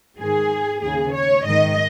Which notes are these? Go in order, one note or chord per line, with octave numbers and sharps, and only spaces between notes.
G#2 D#3 G#4
D#2 C#3 G#4
C#5
G#2 D#3 D#5